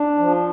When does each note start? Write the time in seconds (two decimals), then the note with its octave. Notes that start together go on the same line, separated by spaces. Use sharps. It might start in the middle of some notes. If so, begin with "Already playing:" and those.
Already playing: D4
0.18 F3